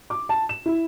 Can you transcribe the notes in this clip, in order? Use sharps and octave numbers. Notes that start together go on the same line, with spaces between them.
D6
A5
E7
E4